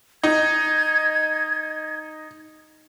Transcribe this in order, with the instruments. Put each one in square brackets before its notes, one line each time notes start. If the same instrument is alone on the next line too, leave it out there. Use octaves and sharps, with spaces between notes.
[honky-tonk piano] D#4 [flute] G#6